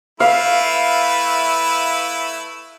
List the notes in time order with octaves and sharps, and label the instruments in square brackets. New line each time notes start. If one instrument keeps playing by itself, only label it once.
[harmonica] A3 E4 B4 [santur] F5